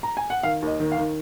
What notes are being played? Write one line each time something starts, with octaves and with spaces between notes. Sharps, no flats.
A#5
G#5
F#5
D#3 F5
D#2
D#5
D#3
F5
D#3